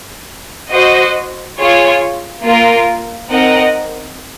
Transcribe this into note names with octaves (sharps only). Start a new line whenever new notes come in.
F#4 C5 D#5
F4 G#4 C#5
A#3 F4 A#4
C4 D#4 A#4 D#5 F#5